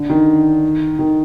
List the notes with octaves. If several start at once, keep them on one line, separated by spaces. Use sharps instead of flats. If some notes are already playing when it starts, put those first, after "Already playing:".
Already playing: D3
D#3
D#3